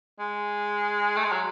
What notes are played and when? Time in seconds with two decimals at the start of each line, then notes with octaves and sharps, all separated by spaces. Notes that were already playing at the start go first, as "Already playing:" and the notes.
0.19 G#3
1.16 A3
1.24 G#3
1.32 F#3